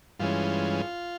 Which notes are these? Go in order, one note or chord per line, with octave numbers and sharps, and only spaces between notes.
G2 E3 G#3 C#4 F4